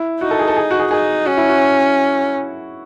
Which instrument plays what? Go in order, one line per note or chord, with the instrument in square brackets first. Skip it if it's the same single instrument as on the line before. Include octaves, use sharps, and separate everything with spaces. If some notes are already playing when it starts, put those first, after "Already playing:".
Already playing: [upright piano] E4
[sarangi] D#4 [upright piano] F#4
[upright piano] A4
G#4
A4
G#4
F#4
G#4
[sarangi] D#4 [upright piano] G#4
[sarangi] C#4 [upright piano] F#4
[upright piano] E4
F#4